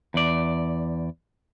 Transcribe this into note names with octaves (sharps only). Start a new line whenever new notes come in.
E2 D5